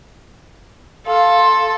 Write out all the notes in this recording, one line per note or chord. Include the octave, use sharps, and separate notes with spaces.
A4 F5 C6